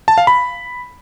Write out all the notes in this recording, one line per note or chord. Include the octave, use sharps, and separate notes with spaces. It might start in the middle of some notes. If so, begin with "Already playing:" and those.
A5
F5
B5